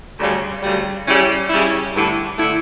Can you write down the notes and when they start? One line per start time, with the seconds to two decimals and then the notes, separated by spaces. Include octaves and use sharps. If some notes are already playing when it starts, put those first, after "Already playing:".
0.19 D2 C#3 G3
0.62 D2 C#3 G3
1.07 C#3 G3 C#4 E4
1.50 C#3 G3 C#4 E4
1.94 G2 D3 A3 E4
2.38 D3 A3 E4